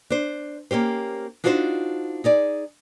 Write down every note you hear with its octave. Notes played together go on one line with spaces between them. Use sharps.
D4 C5
A#3 C#4 G4 C5
D4 D#4 F4 F#4 B4 C5
D#4 G#4 D5